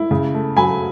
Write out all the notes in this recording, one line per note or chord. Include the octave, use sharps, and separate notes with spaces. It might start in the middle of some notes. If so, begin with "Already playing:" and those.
Already playing: E4
C#3
A3
F#3 G#5 B5